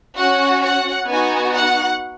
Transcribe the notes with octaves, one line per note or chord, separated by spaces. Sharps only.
C#4 F#4 F#5
F#5
B3 D#4 F#4 G#5
F#5